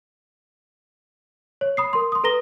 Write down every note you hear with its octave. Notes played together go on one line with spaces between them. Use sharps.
C#5
B5 D#6 C7
A#4 C6
C6 D#6
A4 B4 A#5 A#6 G7